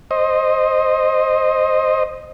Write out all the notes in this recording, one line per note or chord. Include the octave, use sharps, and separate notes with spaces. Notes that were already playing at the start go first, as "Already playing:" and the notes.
C5 D#5